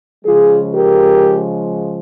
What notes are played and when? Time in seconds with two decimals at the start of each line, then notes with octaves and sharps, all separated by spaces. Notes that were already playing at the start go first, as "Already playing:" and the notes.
0.24 C#3 F3 G#3 F4 G#4
0.73 G4 A#4